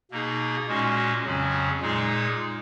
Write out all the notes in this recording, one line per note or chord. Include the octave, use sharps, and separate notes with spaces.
B2 A#3 D#4 G#4
A#2 G#3 C#4 F#4
F2 C#3 F#3 C#4
A#2 G#3 D#4 G#4